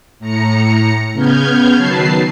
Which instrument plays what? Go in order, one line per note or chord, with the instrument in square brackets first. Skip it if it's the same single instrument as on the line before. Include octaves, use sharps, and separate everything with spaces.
[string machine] A2 A#5 C#7
C#3 B3 F6 G6 G#6
D#3 F#3 B4 A5 C7